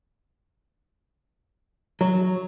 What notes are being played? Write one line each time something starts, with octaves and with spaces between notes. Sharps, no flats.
F#3